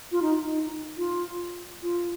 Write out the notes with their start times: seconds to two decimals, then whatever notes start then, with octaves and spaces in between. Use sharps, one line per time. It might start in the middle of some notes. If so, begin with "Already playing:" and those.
0.12 F4
0.22 D#4
0.43 D#4
0.98 F4
1.83 F4